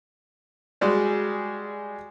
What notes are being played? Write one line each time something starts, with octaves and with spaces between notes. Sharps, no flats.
G3 G#3 F#4 G#4